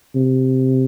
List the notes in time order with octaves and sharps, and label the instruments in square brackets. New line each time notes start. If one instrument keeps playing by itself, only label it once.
[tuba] C3